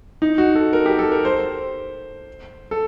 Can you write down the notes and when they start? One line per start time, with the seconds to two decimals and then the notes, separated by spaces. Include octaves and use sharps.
0.22 D#4
0.38 F#4
0.55 A4
0.73 A#4
0.86 G4
0.99 A4
1.12 A#4
1.25 C5
2.71 A4